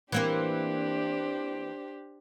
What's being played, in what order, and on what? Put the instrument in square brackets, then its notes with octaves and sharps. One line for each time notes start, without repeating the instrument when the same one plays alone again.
[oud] E3 A#3 C4 [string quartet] D4 G4 C5